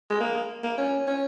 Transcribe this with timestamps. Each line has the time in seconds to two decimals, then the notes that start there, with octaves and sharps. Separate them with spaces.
0.10 G#3
0.20 A#3
0.63 A#3
0.78 C#4
1.07 C#4